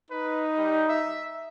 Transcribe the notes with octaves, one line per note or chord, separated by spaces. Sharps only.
D#4 B4
G3
E5